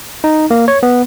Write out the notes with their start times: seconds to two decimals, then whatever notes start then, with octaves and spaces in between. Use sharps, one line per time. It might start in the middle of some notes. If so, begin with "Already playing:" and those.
0.24 D#4
0.51 A#3
0.68 C#5
0.83 B3